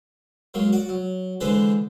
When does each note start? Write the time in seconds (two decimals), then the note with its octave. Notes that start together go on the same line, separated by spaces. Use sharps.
0.54 F#3 G#3 A#3 C#5
0.72 F#4 D5
0.89 F#3
1.41 D3 E3 G#3 D4 B4 C5